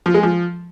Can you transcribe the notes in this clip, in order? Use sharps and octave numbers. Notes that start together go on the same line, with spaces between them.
F3
G#3
F3